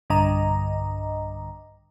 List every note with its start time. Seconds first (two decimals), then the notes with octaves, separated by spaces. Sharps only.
0.10 B1 G2 D3 D#5 A#5